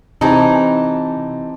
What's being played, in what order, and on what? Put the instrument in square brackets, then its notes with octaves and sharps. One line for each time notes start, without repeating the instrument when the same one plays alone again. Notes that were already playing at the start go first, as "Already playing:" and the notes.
[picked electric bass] C3 [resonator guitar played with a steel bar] E3 D#4 [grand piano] C4 G4 A5